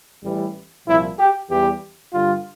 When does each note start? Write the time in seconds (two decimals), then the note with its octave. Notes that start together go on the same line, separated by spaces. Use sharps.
0.24 A1 A2 E3 G3
0.87 C2 A#2 F3 E4
1.18 G4
1.49 E2 E3 G3 G4
2.12 G2 D3 G3 F4